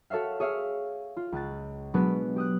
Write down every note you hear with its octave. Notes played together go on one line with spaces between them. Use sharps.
F#4 A4 C#5 E5 F5
G#4 C#5 E5 F5 E6
F4
C#2 F#6 A6
B2 F#3 G#3 B3 D4 B4
G4 D#6 F#6